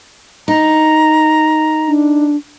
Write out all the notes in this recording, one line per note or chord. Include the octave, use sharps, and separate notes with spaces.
D#4 A#5
D4